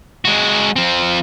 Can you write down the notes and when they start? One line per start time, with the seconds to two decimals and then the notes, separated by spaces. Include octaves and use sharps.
0.25 G#3 F#4
0.76 F3 C4